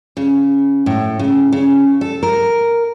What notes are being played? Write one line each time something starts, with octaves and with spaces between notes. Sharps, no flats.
C#3
A2
C#3
C#3
A4
A#4